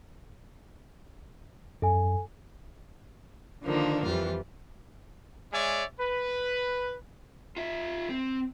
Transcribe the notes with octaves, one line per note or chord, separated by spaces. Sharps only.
F#2 A4 G#5
D3 D#3 F3 A#3 D4
F2 E3 G3 F4
G#3 C#5 D5 E5 G#5
B4
F4 E5
C4